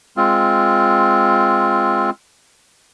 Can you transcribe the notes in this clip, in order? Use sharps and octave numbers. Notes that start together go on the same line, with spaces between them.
G#3 C4 F4